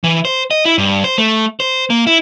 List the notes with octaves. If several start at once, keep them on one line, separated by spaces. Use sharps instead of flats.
E3
C5
D#5
E4
G2
C5
A3
C5
A#3
E4